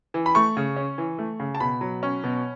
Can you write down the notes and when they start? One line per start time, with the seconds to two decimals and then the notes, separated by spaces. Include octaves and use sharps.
0.14 E3
0.26 B5
0.35 A3 C#6
0.57 C#3
0.76 C#4
0.98 E3
1.18 A3
1.40 C#3
1.55 A5
1.60 B2 B5
1.81 F#3
2.03 C#4
2.24 B2